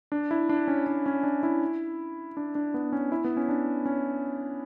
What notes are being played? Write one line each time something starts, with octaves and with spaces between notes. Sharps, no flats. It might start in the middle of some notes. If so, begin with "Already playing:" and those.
D4
E4
D4
C#4
D4
C#4
D4
E4
D4
D4
B3
C#4
E4
B3
C#4
D4
C#4